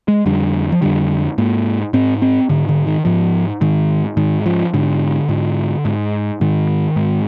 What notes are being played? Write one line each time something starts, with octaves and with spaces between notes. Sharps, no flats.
G#3
F2 D3 G3
F3
F2 D3 G3
G#2 A#3
G#2 C4
C4
G#2 D3
D3
D#3
G#2 F3
G#2 D#3
G#2 D#3
F3
G#2 D3
G#2
G#2
G#2 D#3
G#2